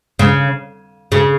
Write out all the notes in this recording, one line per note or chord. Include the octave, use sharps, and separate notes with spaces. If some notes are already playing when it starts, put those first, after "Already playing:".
C#3
C#3